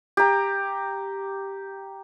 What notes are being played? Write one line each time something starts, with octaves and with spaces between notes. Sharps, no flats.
G4 A#5